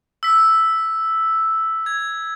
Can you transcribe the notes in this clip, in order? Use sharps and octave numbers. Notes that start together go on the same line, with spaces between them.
E6 B6
G#6